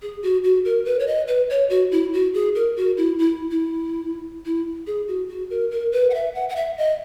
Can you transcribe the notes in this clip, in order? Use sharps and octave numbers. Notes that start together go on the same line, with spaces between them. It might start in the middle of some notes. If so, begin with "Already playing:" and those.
G#4
F#4
F#4
A#4
B4
C#5
D#5
B4
C#5
F#4
E4
F#4
G#4
A#4
F#4
E4
E4
E4
E4
G#4
F#4
F#4
A#4
A#4
B4
F#5
E5
F#5
F#5
E5
D#5